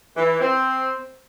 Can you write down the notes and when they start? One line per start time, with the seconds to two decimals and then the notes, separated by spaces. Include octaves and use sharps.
0.15 E3
0.40 C4